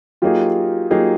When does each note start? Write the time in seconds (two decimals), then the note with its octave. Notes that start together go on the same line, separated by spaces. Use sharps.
0.22 F#3 A#3 D#4 F4 G4 G#4
0.90 F#3 A#3 D#4 F4 G4 G#4